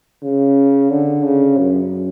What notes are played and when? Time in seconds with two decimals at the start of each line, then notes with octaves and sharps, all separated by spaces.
0.23 C#3
0.91 D3
1.24 C#3
1.58 F#2